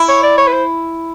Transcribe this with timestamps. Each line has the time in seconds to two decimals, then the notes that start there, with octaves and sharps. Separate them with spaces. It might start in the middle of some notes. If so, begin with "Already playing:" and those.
Already playing: E4
0.08 C#5
0.23 D5
0.38 C#5
0.47 B4
0.53 C5